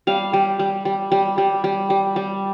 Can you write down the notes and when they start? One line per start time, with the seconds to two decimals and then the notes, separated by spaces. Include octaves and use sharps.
0.07 G3 F5
0.33 G3
0.59 G3
0.85 G3
1.12 G3
1.38 G3
1.64 G3
1.90 G3
2.16 G3